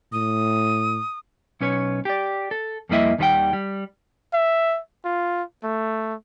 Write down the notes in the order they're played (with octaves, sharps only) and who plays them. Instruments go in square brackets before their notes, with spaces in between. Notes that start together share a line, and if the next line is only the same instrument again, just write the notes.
[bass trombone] A2 [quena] D#6
[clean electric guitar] B1 C#4 B4 C#5
G4 D5
A4
F2 G3 A#3 E4 D#5 E5
D#2 D#3 G3 B4 F#5 G5
G3
[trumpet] E5
F4
A3